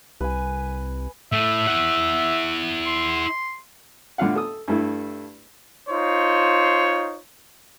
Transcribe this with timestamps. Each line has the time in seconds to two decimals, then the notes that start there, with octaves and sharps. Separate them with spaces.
0.21 C2 B4 G#5
1.32 A2 E5
1.67 E4 F#5
2.86 C6
4.18 A2 D3 F4 F5 F#5
4.35 A4 D#6
4.68 G2 A3 E4
5.89 D#4 F4 C5 C#5